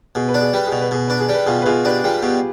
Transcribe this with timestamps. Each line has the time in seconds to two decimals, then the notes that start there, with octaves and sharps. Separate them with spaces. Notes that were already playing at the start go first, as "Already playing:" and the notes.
0.15 B2 G#4
0.28 B4
0.34 D4
0.42 G#4
0.53 G3 B4
0.67 B2 G#4
0.81 B4
0.91 B2 G#4
1.08 D4 B4
1.20 G#4
1.29 G3 B4
1.46 B2 F4 G#4
1.62 B4
1.66 B2 F4 G#4
1.85 D4 G4 B4
2.04 G3 F4 G#4
2.23 B2 G4